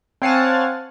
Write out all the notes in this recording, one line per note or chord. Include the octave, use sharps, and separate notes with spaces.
C4 C#5 F5 F#5 G#5 A5